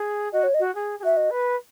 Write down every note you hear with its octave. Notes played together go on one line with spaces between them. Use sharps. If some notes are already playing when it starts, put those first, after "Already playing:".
Already playing: G#4
F#4 D#5
C#5
D#5
F#4
G#4
G#4
F#4 E5
D#5
B4